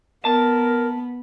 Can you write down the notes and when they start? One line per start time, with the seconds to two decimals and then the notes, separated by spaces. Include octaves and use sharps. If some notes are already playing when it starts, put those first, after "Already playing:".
0.25 B3 A#4 A5